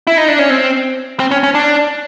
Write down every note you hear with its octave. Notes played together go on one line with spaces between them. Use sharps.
E4
D#4
D4
C#4
C4
C4
C#4
C#4
D4